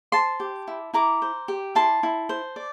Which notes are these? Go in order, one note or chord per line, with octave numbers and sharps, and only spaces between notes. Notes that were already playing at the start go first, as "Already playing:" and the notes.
C5 A5 C6
G4
E4
E4 A#5 D6
C5
G4
E4 A5 C6
E4
C5
D5